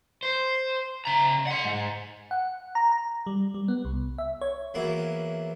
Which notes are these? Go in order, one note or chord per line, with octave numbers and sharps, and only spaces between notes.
C5
C#3 A#5
F#5 C6
G#2
F#5
A#5
A#5
G3
G3
B3
C2
E5
C#5
E2 F#3 A#3 E4